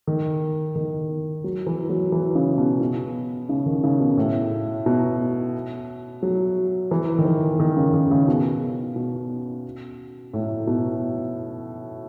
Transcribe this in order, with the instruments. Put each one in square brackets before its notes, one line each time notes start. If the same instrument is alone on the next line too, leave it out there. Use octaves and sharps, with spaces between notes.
[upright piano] D#3
D#3
F#3
E3
F#3
E3
C#3
B2
B2
C#3
D#3
C#3
B2
A2
B2
F#3
E3
D#3
E3
D#3
C#3
D#3
C#3
B2
B2
A2
B2